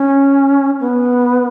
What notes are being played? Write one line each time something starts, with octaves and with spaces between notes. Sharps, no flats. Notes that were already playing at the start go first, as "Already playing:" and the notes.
Already playing: C#4
B3